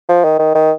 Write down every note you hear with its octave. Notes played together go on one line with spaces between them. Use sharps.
F3
D#3
D#3
D#3